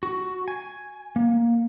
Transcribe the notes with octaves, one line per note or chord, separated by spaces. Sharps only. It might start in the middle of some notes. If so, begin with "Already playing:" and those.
F#4
G#5
A#3